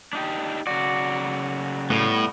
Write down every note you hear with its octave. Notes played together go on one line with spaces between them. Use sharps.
D4 D#4 G4
C#3 F#3 F#4 D5
A2 G3 B3